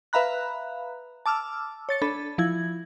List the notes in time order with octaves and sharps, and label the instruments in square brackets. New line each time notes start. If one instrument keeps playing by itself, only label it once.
[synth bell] B4 E5 F5 A#5 B5 F#6
A5 D6 E6 F6
C#5 A6 C#7
D4 A4 B5 A6
F3 E4 G#6